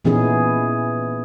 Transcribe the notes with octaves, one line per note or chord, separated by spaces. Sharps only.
A#2 E3 B3 C#4 D#4 G#4